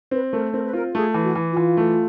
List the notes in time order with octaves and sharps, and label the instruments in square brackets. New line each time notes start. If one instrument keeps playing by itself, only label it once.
[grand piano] C4 [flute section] B4
[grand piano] A3 [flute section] A#4
[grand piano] C4 [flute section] A#4
[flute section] B4
[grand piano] F4 [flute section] A#4
[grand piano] A3 [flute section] G#4
[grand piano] E3
[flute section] F#4
[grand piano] E3
[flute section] F4
[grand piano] E3
A3